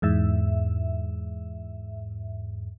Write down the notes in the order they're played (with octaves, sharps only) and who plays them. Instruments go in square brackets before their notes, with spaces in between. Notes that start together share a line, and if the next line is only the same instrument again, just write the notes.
[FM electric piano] E2 G#2 E5